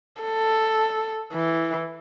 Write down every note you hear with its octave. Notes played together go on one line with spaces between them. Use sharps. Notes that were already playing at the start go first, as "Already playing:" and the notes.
A4
E3